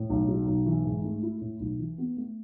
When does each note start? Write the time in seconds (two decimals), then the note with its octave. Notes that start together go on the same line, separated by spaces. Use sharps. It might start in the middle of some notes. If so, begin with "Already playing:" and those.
Already playing: A2
0.10 B1
0.28 F#3
0.47 B1
0.66 E3
0.85 G#2
1.04 A3
1.23 E4
1.41 A2
1.60 B1
1.79 E3
1.98 B3
2.17 A3